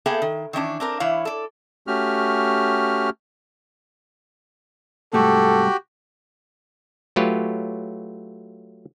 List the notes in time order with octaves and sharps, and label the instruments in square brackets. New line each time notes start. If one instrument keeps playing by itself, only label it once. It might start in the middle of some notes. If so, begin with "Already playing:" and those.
[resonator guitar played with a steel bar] A#3 B3 G#4 A4 E5 G5
D#3
D#3 E3 C#4 D4
C4 D4 A#4
E3 E4 C#5 F5
A4 D5
[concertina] A3 C#4 F#4 G4 F6
[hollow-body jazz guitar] C2 G#2 A3 [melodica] F#4 G4 [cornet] A4
[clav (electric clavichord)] F#3 A3 F4 G4 B4 C#5